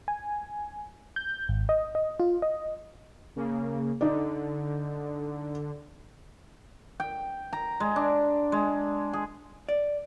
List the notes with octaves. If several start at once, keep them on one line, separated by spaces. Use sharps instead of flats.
G#5
G6
G#1
D#5
D#5
F4
D#5
C#3 A#3
D3 D#4 D5
G5
A#5
G#3
D4
G#3
G#4
D5